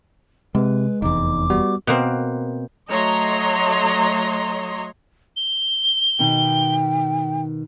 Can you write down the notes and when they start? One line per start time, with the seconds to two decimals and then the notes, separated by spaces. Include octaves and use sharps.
0.55 C3 G#3 B4
1.02 F1 E2 D#4 D6
1.50 G3 B3 F#4
1.87 B2 A#3 C4
2.89 F#3 A3 C#5 D#5 A#5 C6
5.37 G7
6.19 B2 D#3 G5